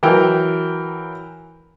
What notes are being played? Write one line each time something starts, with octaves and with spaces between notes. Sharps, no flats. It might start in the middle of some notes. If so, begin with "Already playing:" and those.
E3 F#3 A#4 G5